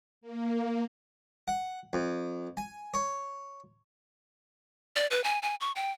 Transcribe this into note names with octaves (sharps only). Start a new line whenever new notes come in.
A#3
F#5
F2
G#5
C#5
D5
B4
G#5
G#5
C#6
G5